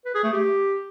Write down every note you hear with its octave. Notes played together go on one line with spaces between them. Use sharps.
B4
G#4
A3
G4